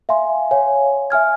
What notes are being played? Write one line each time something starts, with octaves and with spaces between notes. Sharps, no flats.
E5 F5 G#5 C6
C#5 F5 G#5
E5 G#5 F6 G#6